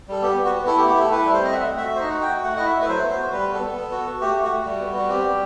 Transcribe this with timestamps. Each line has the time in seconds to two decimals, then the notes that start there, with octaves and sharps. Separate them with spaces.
0.08 G3 A4
0.22 B3 G4
0.37 B3
0.45 F#4
0.52 B3
0.66 E4 A4
0.78 G4
0.82 A3
0.89 G4
0.96 A3 A4
1.11 E4 B4
1.22 G3 A4
1.33 C5
1.40 C4 D#5
1.52 E5
1.55 A3 F#5
1.70 A3
1.77 E5
1.85 F#4
1.95 C5
1.99 D#4 D#5
2.10 F#4 F#5
2.22 G5
2.29 F#4
2.44 A3 F#5
2.57 E4 D#5
2.65 E5
2.74 A3
2.81 B4
2.88 F#3 C5
3.03 B3
3.10 C5
3.18 F#4
3.32 G3 B4
3.47 B3
3.54 A4
3.62 B3
3.77 B3
3.92 F#4
4.06 F#4
4.21 A3 G4
4.35 A3
4.43 F#4
4.50 A3
4.65 G3
4.80 B3
4.94 G3 F#4
5.09 C4 G4
5.24 G3